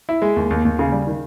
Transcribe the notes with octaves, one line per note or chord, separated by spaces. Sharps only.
E4
G#3
D#2
D#2
D#2
C#3
G3
D#3